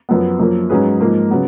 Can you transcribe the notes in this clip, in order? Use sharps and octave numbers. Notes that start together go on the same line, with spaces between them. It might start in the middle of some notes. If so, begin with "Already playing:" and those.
F#2 F3 B3
F#2 F3 A#3
G#2 F#3 C#4 G#4 B4
G#2 F3 A#3
C#3 F#3 B3